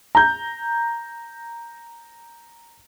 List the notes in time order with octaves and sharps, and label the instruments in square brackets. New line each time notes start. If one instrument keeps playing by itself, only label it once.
[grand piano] A#5 G6